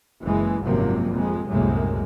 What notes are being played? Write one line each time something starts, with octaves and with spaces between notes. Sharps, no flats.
F#1 E3 G#3
G#1 F#2 C3 F3 F#3 A#3
F2 C3 G#3
C2 F#2 A2 C3 G#3 A#3